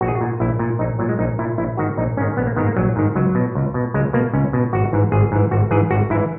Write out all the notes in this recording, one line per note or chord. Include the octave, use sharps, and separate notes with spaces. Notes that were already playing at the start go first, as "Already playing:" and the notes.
A#1 F#4
G#4
F#4
A#2
A#1 E4
A#2
A#1 D#4
A#2 F#3
G#3
A#1 D#4
A#2 E4
A#1 E4
G#2 D#3 F#4
A#1 D#4
G#2 D#3 C#4
A#1 B3
A#3
G#2 D#3 B3
A#3
A#1 F#3
G#2 D#3
C#2 F#3
B2
C#2
B2
C#2 G#3
B2 A#3
C#2 C#4
B2
G#1 F#4
G#2 E3
G#1 G#4
G#2 E3
G#1 F#4
G#2 E3 G#4
G#1 F#4
G#2 E3 E4